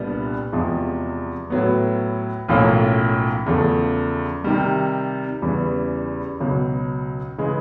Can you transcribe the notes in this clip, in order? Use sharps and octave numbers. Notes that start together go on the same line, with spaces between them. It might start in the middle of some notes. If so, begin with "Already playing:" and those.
Already playing: C2 A#2 G3 B3 D4
E2 C3 F3 G#3
A2 F#3 B3
B1 A2 F3 A#3 C#4
E2 C#3 F3 A3
C3 D#3 G3
E2 C#3 E3 G3
C#2 B2 F#3
C#3 E3 G#3